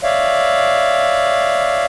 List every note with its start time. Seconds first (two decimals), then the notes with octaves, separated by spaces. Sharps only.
0.03 C#5 D5 E5 F5